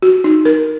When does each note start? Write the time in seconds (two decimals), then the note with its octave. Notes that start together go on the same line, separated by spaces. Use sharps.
0.02 F#4
0.24 D#4
0.45 A#4